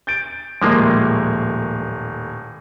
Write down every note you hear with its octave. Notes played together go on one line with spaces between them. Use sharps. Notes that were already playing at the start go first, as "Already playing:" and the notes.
G6 A6 D7
D#1 A2 F3 G#3 A#3 D6